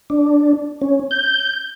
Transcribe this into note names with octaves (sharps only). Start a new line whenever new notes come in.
D4
C#4
G6